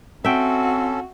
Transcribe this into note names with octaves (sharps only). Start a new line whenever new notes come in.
C4 C#4 F#4 A4 E5 G5